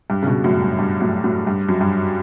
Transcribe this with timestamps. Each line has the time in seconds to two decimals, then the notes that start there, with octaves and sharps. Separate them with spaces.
0.10 G2
0.23 C#3
0.27 G2 B2
0.44 F#2 A2
0.61 G2
0.79 G2
1.00 F#2 A2
1.24 F#2 A2
1.47 G2
1.69 F#2
1.81 G2